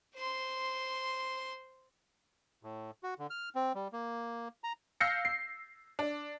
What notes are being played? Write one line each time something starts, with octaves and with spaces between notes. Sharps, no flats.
C5 C6
A2
F#4
D3
F6
C4
G3
A#3
A#5
F5 E6 G6 A#6 C7 C#7
C7
D4